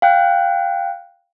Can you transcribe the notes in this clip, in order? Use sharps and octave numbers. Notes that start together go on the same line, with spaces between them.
F5 G5 F#6